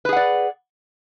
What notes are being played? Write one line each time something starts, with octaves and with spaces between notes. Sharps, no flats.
G#4 B4 D5 F#5